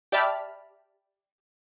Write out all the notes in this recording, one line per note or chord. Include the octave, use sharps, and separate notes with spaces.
G4 D5 E5 A5 B5 F6